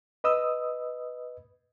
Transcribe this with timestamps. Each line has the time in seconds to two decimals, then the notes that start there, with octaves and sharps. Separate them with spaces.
0.24 B4 D#5 D#6 E6